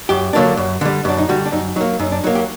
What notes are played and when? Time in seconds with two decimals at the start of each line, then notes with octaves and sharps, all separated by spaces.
0.09 F#2 G4
0.33 D3 F#3 A#3 D4
0.57 F#2
0.81 D3 G3
1.05 F#2 D4
1.18 D#4
1.29 D3 G3 F#4
1.46 D4
1.52 F#2 D#4
1.76 F#3 D#4
1.81 A#3
1.99 F#2 D#4
2.12 D4
2.24 F#3 A#3 D#4
2.35 G4